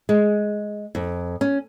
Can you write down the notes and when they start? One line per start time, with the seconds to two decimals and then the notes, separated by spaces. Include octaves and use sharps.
0.09 G#3
0.95 F2
1.41 C#4